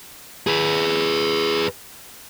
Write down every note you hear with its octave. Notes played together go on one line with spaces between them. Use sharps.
G#4 B4